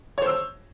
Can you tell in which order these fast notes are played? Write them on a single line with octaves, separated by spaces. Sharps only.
C#5 C5 E6